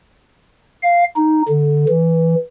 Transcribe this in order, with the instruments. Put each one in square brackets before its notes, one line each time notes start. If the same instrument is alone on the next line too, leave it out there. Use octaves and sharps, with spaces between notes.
[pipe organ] F5
D#4
D3
E3